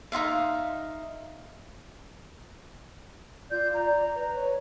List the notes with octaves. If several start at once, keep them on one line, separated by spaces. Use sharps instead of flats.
D#4 F4 E5 F5
F4 D5 G6
A#5
B4
C#5